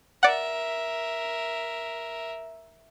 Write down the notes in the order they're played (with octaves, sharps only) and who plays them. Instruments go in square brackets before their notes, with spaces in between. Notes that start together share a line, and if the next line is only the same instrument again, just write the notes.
[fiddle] A#4 E5 [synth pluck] D5 F#5